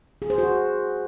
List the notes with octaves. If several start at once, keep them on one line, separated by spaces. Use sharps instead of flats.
G#4
C5
F#4